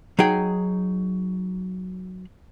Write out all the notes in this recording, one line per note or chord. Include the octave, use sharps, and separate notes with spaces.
F#3 D#4 G#4 G5